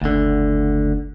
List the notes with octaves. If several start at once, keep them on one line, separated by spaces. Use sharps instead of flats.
F#1 D2 D3